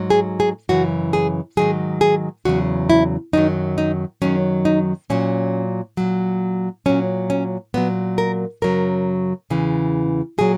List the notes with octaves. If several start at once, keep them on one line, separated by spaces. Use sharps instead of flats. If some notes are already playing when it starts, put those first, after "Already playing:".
Already playing: G#2 F#3
G#4
G#4
F#2 C#3 E3 F#4
G#4
G#2 D#3 F#3 G#4
G#4
E2 C#3 F#3 F#4
E4
F#2 D#3 F#3 D#4
D#4
F#2 D#3 F#3 C#4
D#4
A#2 F#3 C#4
A#2 F#3
A#2 F#3 C#4
C#4
A#2 F#3 B3
A#4
F#2 C#3 F#3 A#4
E2 C#3 E3
A#2 F#3 G#4